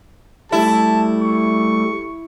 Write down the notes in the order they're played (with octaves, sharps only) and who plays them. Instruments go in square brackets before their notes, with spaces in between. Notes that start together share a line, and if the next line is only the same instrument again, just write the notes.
[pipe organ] G3 A3 [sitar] E4 [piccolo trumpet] A5
[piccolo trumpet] C#6